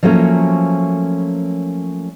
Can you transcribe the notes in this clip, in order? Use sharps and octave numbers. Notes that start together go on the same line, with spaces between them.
F3 F#3 A3 A#3 C#4